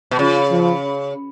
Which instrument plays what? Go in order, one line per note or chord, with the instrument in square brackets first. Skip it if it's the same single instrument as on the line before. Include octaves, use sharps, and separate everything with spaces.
[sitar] B2
[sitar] C#3 [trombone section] F3
[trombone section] F3